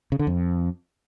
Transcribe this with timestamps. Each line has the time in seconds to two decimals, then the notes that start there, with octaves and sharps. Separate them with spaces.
0.12 C#3
0.19 D3
0.27 F2